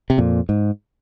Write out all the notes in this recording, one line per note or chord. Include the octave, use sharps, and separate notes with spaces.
C3
F2 A#2
G#2